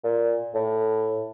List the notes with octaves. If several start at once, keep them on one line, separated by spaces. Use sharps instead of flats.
A#2
A2